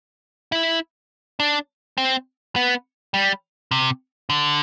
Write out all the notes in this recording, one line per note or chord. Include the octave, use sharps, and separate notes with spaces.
E4
D4
C4
B3
G3
C3
D3